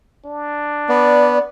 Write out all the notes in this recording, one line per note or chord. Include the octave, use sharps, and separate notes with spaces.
D4
B3 D5